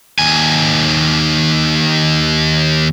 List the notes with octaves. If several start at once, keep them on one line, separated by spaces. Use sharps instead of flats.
D#2 G#5